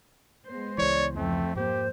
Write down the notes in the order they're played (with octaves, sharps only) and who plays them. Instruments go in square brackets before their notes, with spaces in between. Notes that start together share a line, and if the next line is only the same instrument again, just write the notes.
[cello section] G#3 B3 C5
[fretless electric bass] C#2 E3 [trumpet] C#5 [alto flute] D5
[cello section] F2 F3 [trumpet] A3 [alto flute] C4
[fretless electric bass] G#2 A#3 [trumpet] G4 [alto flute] C5